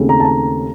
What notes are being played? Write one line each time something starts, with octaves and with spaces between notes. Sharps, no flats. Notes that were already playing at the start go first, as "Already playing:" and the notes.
Already playing: D#2 C#3 A3 C4
A#5
A5
A#5